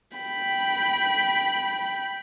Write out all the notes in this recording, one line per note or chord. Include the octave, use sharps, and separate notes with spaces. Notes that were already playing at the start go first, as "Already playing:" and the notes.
G5 B5